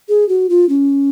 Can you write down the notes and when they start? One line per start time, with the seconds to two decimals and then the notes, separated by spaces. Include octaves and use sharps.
0.09 G#4
0.29 F#4
0.50 F4
0.69 C#4